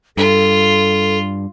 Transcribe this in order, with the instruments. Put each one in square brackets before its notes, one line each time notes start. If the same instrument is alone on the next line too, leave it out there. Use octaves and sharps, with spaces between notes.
[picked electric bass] G2 [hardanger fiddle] F4 [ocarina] A4